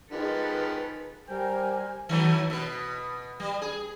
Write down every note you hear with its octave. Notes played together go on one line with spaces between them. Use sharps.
D#3 F3 G#3 A4 B4
G3 A#4 C5 G5 G#5
D#3 F#3 A3
B2 B4
G3
G#4